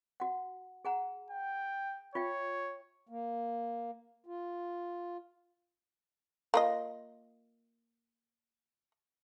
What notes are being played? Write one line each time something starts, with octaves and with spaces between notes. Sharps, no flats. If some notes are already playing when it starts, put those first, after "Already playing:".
F#4 F#5
G#4 F#5 A#5
G5
F4 C#5 E5 G5
A#3
F4
A#3 F4 D#5